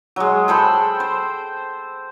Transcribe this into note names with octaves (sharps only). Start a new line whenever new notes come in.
F#3 G#3
A4 C5 G5 B5
C5